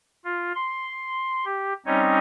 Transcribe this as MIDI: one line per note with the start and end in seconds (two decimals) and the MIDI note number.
0.24 0.52 65
0.55 1.45 84
1.45 1.73 67
1.86 2.19 55
1.86 2.19 60
1.86 2.19 61
1.86 2.19 63
1.86 2.19 73
1.86 2.19 75